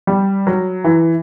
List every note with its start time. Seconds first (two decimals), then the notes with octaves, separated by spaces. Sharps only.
0.07 G3
0.47 F#3
0.84 E3